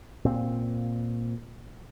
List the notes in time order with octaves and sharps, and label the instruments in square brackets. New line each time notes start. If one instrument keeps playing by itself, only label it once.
[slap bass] A#2 C4